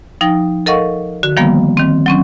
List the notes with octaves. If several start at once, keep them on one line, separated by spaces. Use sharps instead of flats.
F3 D#4 G5 A#6
A4 A#4 D#5 F5 F#5 C#6
D3 F#4
D#3 F3 G3 A#3 B3
D#3 C4
F#3 C4 C#4